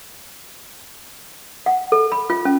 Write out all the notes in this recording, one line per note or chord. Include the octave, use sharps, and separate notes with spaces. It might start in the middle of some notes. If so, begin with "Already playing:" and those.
F#5
A4
B5
F4
C#4